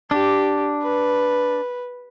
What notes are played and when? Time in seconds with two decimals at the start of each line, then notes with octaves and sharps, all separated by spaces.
0.10 D4 G4
0.82 B4